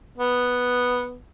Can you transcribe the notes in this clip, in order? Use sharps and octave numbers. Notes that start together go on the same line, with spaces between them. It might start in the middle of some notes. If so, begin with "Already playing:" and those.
B3